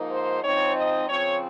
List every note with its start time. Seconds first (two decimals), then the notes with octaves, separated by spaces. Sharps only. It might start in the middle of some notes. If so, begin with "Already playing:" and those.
Already playing: G#2 F3 A#3 D#4
0.11 C5
0.43 G#2 F3 C4 D#4 C#5
0.75 D#5
1.08 C#3 F3 C4 C#5